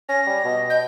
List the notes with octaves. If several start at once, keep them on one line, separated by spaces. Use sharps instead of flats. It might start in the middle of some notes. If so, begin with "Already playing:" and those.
C#4 A#6
G3
B2 D#5
G6